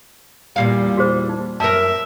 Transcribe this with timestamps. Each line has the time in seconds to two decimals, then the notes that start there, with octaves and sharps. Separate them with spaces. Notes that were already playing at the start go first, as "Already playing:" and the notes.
0.56 E2 A#2 G3 F5
0.97 F#4 G#4 C5
1.29 D#4
1.60 F#2 A#4 E5 A5